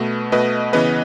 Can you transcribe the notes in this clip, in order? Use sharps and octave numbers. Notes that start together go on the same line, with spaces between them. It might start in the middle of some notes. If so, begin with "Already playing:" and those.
Already playing: B2 A3 B4
B2 A3 B4 D#5
C#3 E3 B3 B4 D#5